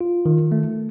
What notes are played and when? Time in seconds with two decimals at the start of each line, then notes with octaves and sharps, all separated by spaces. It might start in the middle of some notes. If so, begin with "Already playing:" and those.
0.01 F4
0.26 D#3
0.52 A3